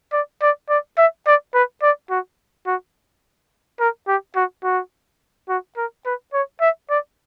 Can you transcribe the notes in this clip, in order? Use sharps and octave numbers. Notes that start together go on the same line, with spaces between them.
D5
D5
D5
E5
D5
B4
D5
F#4
F#4
A#4
G4
F#4
F#4
F#4
A#4
B4
C#5
E5
D5